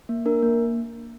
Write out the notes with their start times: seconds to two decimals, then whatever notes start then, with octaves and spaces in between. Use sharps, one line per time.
0.09 A#3
0.26 D4 A#4
0.42 A#3